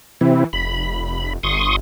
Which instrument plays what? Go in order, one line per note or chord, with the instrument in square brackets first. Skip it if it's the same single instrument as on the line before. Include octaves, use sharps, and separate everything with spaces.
[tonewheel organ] C3 C4 E4 [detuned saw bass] E3
[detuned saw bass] F1 [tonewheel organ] B5
[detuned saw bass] G1 [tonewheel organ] C6 C#6 D#6